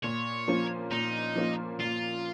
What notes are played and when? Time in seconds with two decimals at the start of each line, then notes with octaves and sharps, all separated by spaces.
0.04 A#2 C#5
0.48 F3 A#3 C#4 F4
0.91 A#2 D#4
1.35 F3 A#3 C#4 F4
1.80 A#2 F4